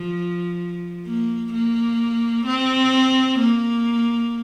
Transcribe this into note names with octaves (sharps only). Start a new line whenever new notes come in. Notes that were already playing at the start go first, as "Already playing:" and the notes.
Already playing: F3
A#3
A#3
C4
A#3